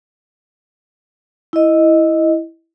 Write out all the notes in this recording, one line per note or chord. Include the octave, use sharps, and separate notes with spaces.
E4 D#5